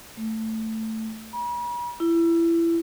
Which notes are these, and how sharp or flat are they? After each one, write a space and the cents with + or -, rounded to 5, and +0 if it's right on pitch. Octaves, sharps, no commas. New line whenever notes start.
A3 +10
B5 -45
E4 +25